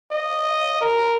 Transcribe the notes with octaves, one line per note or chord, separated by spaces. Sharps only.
D#5
A#4